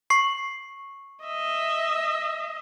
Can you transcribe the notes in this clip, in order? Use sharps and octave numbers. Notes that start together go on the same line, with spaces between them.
C#6 C7
D#5 E5